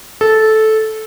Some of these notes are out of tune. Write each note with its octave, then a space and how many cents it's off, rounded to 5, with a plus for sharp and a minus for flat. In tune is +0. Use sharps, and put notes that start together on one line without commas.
A4 -10